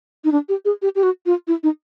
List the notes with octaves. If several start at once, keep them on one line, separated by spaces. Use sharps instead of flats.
D#4
D4
G4
G#4
G4
G4
F#4
F4
E4
D#4